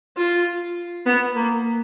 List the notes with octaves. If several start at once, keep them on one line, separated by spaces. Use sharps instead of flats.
F4
B3
A#3